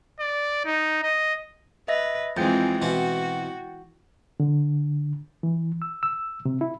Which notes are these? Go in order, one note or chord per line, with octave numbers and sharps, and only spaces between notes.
D5
D#4
D#5
B4 D#5 E5 A#6
F2 E3 G#3 C4 G5 G6 A6
B2 E3 C4 F#4
D3
E3
E6
E6
C3
E4